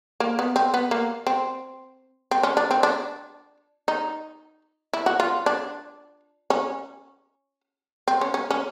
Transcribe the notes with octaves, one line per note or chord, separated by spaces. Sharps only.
A#3
B3
C4
B3
A#3
C4
C4
C#4
D4
C4
D4
D#4
E4
F#4
F4
D4
C#4
C4
C#4
C#4
C#4